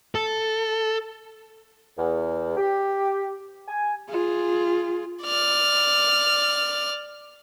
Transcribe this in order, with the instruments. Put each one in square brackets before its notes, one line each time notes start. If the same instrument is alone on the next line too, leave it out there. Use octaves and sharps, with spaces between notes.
[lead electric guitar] A4
[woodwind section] E2
G4
G#5
[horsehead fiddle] F4 G#4
[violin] D5 F6